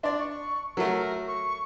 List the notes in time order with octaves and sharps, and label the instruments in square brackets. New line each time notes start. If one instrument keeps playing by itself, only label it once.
[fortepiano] D4 D5 [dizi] C6
[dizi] C#6
[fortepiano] F#3 A3 [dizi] A#4
[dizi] C#6